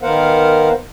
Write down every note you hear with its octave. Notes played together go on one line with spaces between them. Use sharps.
D#3 B3 A#4 C5 F5 F#5